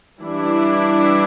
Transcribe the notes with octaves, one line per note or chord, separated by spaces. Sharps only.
E3 G3 D4 E4